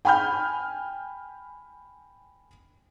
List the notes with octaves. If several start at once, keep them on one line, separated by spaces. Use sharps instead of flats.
G5 G#5 B5 F6 G6